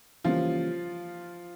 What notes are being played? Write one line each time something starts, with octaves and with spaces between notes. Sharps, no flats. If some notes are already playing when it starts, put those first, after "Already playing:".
C#3 E3 F3 G3 A#3 C#4 F4